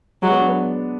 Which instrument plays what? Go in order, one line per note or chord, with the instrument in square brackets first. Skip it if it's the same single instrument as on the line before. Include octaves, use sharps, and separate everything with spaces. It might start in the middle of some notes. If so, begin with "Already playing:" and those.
[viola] F#3 [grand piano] G#3
[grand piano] B3
D4
B3